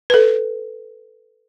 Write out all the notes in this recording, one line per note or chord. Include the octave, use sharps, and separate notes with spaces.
A4 B4